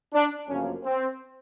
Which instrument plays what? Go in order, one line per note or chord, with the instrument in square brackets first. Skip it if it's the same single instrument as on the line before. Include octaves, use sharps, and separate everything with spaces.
[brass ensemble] D4
G1 F#2 C#3 F3 A#3 C#4
C4